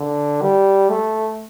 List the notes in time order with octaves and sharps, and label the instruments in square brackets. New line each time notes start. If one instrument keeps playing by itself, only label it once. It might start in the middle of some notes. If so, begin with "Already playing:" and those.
Already playing: [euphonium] D3
G3
A3